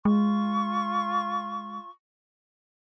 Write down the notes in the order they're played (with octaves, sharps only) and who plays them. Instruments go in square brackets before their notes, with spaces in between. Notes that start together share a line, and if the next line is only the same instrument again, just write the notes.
[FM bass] G#3 [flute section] F4 C#6